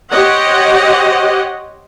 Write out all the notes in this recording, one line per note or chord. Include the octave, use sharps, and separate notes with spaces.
G4 C5 C#5 D#5 F#5